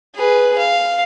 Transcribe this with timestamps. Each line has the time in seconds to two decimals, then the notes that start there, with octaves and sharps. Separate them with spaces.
0.16 G#4 B4
0.58 F5